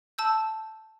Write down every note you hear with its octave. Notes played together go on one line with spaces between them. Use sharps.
A5 E6 G6